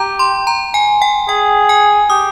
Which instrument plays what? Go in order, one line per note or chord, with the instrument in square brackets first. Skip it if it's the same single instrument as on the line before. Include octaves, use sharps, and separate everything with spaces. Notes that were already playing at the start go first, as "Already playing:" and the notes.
Already playing: [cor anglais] G4 [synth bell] A#5
[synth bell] C6
A#5
G#5
G5
[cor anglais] G#4 [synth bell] G5
[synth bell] G#5
[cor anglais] G4 [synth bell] D#6